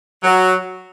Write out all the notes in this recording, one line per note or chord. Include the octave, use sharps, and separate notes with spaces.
F#3